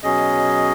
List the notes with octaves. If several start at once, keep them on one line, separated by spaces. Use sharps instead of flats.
B2 F#3 C#4 G#4 D#5